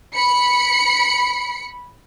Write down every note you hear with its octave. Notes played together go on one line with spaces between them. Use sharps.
B5 C#7